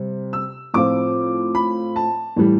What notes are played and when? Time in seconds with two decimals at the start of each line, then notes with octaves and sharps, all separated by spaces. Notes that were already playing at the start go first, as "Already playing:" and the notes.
Already playing: C3 G3
0.33 E6
0.74 A2 F3 C4 F4 D6
1.55 B5
1.96 A5
2.36 A2 E3 G3